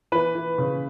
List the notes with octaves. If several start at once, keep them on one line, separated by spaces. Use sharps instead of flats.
E3 B4
E3
C#3